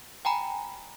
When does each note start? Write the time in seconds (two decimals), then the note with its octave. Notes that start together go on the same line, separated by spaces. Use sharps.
0.25 G5 G#5 A#5 B5